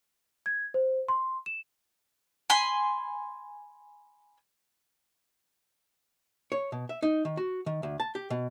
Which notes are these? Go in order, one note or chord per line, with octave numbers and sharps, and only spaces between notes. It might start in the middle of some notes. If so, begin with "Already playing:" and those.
G#6
C5
C6
E7
G#5 B5 C6
C#5
B2
E5
D#4
D#3
F#4
D#3
D2
A5
G4
B2